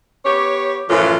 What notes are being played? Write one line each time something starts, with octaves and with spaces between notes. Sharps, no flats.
B3 G4 C#5
F#2 A2 E3 F3 F4